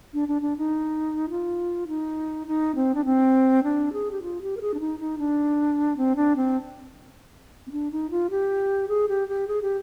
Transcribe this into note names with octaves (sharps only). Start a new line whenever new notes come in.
D4
D4
D4
D#4
F4
D#4
D#4
C4
D4
C4
D4
G#4
G4
F4
G4
A#4
G#4
D4
D#4
D#4
D4
C4
D4
C4
C4
D4
D#4
F4
G4
G#4
G4
G4
G#4
G4